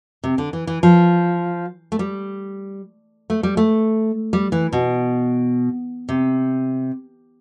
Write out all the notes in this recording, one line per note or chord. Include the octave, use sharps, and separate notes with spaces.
C3
D3
E3
E3
F3
A3
G3
A3
G3
A3
G3
E3
B2
C3